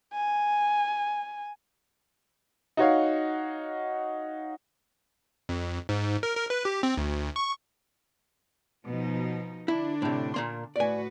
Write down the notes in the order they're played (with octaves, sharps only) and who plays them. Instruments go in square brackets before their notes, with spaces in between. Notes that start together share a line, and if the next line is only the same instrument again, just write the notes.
[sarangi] G#5
[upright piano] D#4 F#4 C#5 F5
[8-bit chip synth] F2
G#2
A#4
A#4
B4
G4
C4
D2
C#6
[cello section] B2 F3 D#4
[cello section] D3 D4 [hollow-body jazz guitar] E4
[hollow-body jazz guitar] A2 C3
A#2 A#3 C6
[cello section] A2 F#4 B4 [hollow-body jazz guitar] D5 G#5